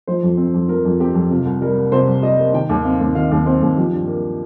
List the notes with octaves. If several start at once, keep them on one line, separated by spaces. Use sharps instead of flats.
F3 C5
F2
C4
F2
F3 A#4
F2
C4 G4
F2
C3 F4
C2
G3 A#4
A#3
C3 C5
C2
G3 D#5
A#3
D#3 G5
D#2
C4 F5
D#2
D#3 F5
D#2
C4 C5
D#2
F3 G4
G2
A#3